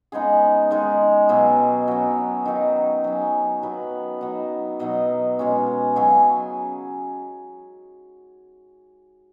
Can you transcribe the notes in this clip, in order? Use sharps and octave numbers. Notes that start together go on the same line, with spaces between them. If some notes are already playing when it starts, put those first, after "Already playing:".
C#3 G#3 B3 D#4 G#4
D#3 G#3 D#4
B2 F#3 B3 G#4
F#3 C#4
D#3 F#3 D#4
F#3 C#4
D#3 F#3 B3 B4
F#3 B3 D#4
B2 F#3 D#4 D#5
B2 G#3 C#4
C#3 F#3 C#4 G#5